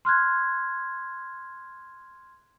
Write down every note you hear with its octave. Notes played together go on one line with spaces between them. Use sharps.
C6 F6 F#6 G#6